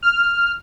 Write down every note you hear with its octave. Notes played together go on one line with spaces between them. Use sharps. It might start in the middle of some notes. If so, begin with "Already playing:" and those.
F6